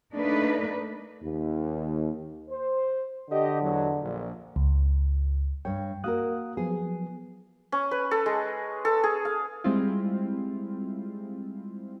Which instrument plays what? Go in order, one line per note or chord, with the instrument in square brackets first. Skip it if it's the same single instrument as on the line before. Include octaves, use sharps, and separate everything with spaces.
[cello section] A3 A#3 D4 D#4 B4
[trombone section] D#2
[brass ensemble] C5
[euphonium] D3 [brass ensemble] G4 D#5
[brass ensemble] E2 F#3
A#1
[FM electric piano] C#2
[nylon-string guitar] G2 C#5 [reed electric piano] G5
[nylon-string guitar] A#3 F#4 A#4 [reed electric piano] F5 D#6 F#6
[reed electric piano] F3 F#3 B3 [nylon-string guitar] G#4
[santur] C#4
B4
A4
G#3
A4
G#4
F5
[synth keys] G3 G#3 C4 E4 F4